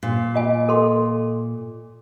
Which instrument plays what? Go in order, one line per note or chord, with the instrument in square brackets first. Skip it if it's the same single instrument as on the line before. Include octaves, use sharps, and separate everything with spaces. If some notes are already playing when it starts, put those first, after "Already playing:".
[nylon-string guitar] A#2
[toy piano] F4 D#5 G#5
A4 C6